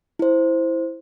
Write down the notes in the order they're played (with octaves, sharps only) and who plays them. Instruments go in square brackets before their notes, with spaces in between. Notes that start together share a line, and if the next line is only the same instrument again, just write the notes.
[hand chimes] E4 C5